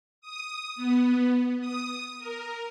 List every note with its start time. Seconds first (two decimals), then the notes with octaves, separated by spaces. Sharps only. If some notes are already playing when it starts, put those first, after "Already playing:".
0.21 D#6
0.76 B3
1.60 D#6
2.19 A#4